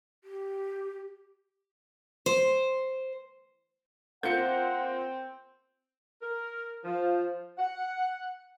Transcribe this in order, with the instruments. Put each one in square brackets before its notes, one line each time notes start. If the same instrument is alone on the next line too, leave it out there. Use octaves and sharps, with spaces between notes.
[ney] G4
[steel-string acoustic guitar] C5
[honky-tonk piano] A#3 F4 [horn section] C4 [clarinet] F#5 [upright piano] G6 C#7
[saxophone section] A#4
F3
F#5